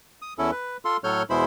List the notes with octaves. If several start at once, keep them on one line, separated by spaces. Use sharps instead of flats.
D#6
E2 C#4 E4 A4
B4
F4 A4 C6
A2 F#3 A4 C#5 F6 G6
E2 B2 G#3 E4 C5 B5